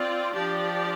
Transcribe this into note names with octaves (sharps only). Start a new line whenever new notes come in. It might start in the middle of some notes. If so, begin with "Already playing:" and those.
Already playing: C4 F4 D5
F3 D4 G4 D5